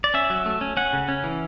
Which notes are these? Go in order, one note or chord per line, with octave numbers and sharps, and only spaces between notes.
D5
C#4 E5
F#3
A3
C#4
C#4 F#5
C#3
C#4
E3